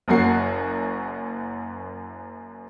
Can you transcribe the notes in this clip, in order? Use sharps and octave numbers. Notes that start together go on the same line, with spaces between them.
F#1 F#2 A#3 F#4 C7